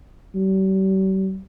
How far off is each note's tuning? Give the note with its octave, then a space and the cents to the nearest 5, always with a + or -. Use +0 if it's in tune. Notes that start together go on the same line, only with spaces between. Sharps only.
G3 -45